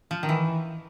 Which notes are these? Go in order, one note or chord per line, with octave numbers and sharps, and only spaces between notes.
F3
D#3
E3